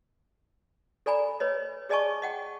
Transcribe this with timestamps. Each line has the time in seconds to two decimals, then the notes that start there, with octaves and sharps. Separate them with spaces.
1.06 A4 D5 G#5 A#5 B5
1.40 B4 C#5 D#5
1.89 G#4 D5 D#5 G#5 A5 C#6
2.22 D#5 F#5 G5